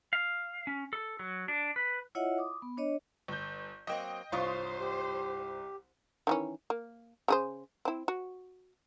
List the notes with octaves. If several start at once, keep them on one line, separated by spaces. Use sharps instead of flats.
F5
C#4
A4
F#3
D4
B4
E4 F4 C#5 D#5 E5 F#5
D6 D#6
B3
D4 C#5 D#5
G1 G6
F#3 A#3 C4 D#5 G5
C2 G2 F4 C5 C#5 D#6
G4
D#3 E3 C#4
A#3
C#3 G#4 C5
C4 E4
F#4